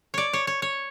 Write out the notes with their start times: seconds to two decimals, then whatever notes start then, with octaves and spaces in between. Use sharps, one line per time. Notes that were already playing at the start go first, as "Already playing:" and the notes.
0.14 C#5 D5
0.33 C#5
0.47 C#5
0.62 C#5